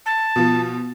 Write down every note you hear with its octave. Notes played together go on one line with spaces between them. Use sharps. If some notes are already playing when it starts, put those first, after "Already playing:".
A5
B2 F3